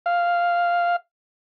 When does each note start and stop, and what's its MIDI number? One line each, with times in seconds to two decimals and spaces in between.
0.06 0.96 77